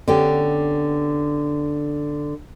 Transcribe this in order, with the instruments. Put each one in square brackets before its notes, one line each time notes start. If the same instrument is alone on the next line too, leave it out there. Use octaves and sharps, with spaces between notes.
[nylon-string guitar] D3 B3 C#4 G4